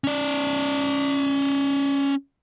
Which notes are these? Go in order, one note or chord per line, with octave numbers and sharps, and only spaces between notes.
C#4 D5